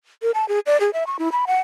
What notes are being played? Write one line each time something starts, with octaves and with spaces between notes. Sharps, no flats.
A#4
A5
G#4
D5
G#4
E5
C#6
E4
B5
F#5